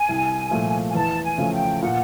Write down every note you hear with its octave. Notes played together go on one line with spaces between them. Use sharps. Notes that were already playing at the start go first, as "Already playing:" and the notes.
Already playing: G#5
C2
A#2 F3 A3
G#5
E2 A5
G#5
C#3 F3 A3
G5
A#2 F#5